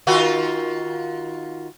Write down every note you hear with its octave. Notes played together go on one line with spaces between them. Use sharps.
D#3 F4 F#4